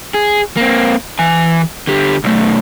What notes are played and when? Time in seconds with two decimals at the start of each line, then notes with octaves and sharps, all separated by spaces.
0.14 G#4
0.57 A#3 C4
1.19 E3 G#5
1.87 D3 G4
2.24 B1 A3